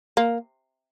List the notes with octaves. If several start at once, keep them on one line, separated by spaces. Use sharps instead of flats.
A#3